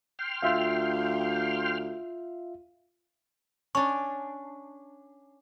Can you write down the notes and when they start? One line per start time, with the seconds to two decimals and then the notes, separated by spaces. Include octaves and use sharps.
0.19 G5 C6 F6
0.43 D2 F4 E5 F5
3.75 C#4 D4 C#6